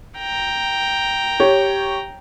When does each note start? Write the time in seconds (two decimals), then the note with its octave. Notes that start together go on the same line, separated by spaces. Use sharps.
0.18 G5 A#5
1.40 G4 C#5